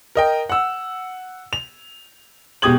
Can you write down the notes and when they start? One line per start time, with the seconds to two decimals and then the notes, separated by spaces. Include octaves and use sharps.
0.15 A#4 D#5 G5
0.49 F#5 E6
1.53 F7
2.62 E1 B2 G4 D#6 G#6 F#7